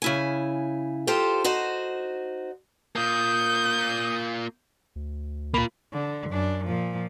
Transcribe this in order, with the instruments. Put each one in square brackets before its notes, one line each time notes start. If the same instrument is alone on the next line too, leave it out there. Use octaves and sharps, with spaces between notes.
[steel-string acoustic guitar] C#3 E4 G#5
F4 G4 A4 C5
D#4 F#4 C5
[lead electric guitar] A#3 F4 [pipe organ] D#6 [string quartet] G6
[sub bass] D2
[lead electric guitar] A#3 F4 [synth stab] B5
[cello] D3
F#2 D4
A#2 F3